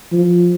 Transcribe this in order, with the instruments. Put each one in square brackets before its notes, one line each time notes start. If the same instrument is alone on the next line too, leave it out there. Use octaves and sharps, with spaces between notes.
[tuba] F3